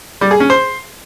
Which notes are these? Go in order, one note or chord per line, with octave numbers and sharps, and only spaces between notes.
G3
G#4
C#4
C5